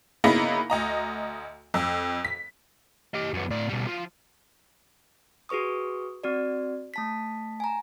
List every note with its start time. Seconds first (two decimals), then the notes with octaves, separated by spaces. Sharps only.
0.24 C#3 A#3 B3 D#4 E4 A#6
0.70 D2 D#5 A#5
1.74 F2
2.25 B6
3.14 G4 D#5
3.34 F#2 B3
3.50 A2 D5
3.69 B2 G3
3.87 F3
5.49 F#4 G#4 B4 C#6 D#6
6.23 C4 F#4 D5
6.94 A3 A5 B6
7.60 G#5 A#5